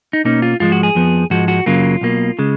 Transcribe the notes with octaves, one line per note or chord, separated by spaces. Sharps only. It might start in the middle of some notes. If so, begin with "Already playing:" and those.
D#4
B2 A#3 C#4 D#4
F4
G#2 F3 G#3 F4
F#4
G#4
F2 F3 B3
G#2 F3 G#3 F#4
F#4
F#2 C#3 F#3 A#3 F4
B1 B2 A#3
C#3 G#3